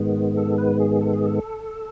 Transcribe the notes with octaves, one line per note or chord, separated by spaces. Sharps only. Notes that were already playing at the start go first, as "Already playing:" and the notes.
Already playing: G#2 D#3 G#3 B3
A4
B4
G#4
A4
G#4
A4